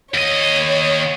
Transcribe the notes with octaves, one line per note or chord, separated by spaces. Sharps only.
D#2 C#5 D#5